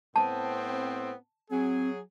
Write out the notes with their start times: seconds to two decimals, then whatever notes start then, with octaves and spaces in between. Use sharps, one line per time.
0.16 A2 B3 C4 A5
1.50 F#3 C4 G#4